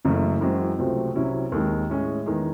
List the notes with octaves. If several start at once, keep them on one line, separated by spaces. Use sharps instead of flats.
F#1 F#2 C#3 E3 A3
F#2 E3 G#3 C4 F#4
C#2 C3 F#3 A3 C4
C2 C3 F#3 C#4 E4
D#2 D#3 G#3
A2 G#3 C#4 G#4
E2 D#3 G#3